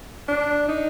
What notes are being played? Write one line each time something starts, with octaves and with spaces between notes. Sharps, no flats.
D4
D#4